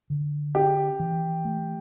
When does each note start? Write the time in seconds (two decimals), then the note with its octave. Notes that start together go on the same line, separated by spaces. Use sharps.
0.10 D3
0.54 C#4 G4
1.00 E3
1.45 A3